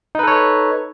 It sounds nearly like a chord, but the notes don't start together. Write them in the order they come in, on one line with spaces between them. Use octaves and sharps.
D#4 B4 A4 C#5